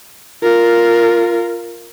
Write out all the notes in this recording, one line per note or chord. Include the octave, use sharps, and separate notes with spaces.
F4 A#4